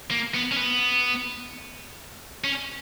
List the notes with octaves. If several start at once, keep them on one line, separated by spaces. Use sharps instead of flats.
A#3
B3
C#4
B3
C#4